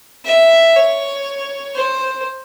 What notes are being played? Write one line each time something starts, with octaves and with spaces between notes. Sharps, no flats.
E5
C#5
C5